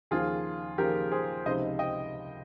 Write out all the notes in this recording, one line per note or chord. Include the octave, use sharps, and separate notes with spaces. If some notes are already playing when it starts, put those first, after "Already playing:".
D#2 C#3 F3 F4 G#4
D#2 C#3 F3 G4 A#4
G#4 C5
C#2 C3 F3 C4 D#4 C5 D#5
D#5 G5